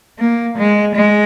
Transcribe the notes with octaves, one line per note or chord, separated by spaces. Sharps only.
A#3
G#3
G#3